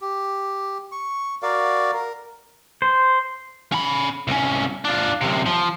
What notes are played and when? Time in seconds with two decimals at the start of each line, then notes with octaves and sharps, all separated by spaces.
0.01 G4
0.92 C#6
1.42 F#4 A#4 D5 F5
1.94 A#4
2.82 C5
3.72 C#4 B5
4.27 C2 C#4
4.85 D4 F4
5.21 F#2 C3
5.46 F3